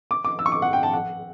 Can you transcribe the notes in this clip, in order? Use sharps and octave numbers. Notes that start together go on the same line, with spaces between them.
D6
D6
E6
C#6
D6
F#5
G5
A5
F#5